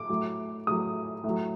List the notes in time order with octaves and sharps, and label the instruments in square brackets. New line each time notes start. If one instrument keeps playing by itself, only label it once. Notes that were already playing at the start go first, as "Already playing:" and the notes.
Already playing: [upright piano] D6
A2 F#3
A2 F#3 D#6
A2
F#3